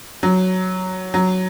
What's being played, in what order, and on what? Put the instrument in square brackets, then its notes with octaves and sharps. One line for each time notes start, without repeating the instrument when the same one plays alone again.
[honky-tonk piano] F#3
F#3